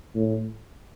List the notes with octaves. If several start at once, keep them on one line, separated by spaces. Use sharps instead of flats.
A2